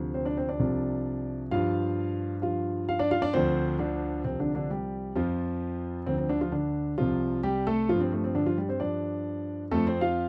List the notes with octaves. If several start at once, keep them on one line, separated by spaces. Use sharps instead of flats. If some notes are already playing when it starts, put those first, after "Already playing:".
Already playing: D2 C3 F3
C4 C5
D4 D5
C4 C5
D4 D5
C2 C3 F3
G2 F3 F4 F5
G2 F3 F4 F5
F4 F5
D4 D5
F4 F5
D4 D5
D2 D3 F3 C4 C5
D3 D4
C2 C3 F3 C4
D3 D4
D3 D4
G3 G4
F2 F3 F4
D2 D3 F3 C4
C4
D3 D4
F3 F4
D3 D4
C2 C3 F3 F4
G3 G4
A3 A4
G2 F3 F4
C4
A3
C4
D3 D4
F3 F4
G3 G4
C4 C5
G2 F3 D4 D5
F2 F3 A3 A4
C4 C5
F4 F5